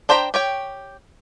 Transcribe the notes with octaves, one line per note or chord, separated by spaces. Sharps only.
D4 C5 G5 A#5 B5
G4 C#5 G5